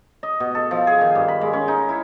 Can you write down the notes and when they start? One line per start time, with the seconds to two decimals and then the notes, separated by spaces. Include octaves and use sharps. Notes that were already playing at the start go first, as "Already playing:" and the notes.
0.23 D#5
0.40 B2
0.55 A4
0.71 F3
0.87 G#4
1.01 D#3
1.15 G2
1.28 B5
1.41 G#3
1.53 C#4
1.68 D#4
1.89 E4